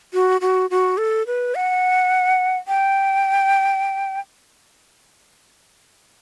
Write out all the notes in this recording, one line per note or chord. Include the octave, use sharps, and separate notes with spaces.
F#4
F#4
F#4
A4
B4
F#5
G5